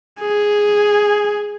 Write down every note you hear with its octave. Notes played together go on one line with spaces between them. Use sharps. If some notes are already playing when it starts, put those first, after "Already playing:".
G#4